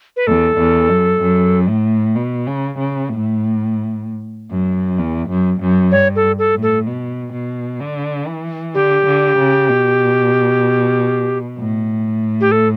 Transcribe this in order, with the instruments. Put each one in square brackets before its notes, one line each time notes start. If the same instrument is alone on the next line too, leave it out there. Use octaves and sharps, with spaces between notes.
[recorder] B4
[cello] E2 [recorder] A4
[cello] E2
F#2
F#2
A2
B2
C#3
C#3
A2
F#2
E2
F#2
F#2
[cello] G2 [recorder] C#5
[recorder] A4
A4
[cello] A2
[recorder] A4
[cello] B2
B2
D3
E3
[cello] D3 [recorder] G4
[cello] D3
C#3
B2
A2
[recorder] G4
A4